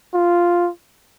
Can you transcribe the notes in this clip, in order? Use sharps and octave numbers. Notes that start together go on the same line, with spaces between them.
F4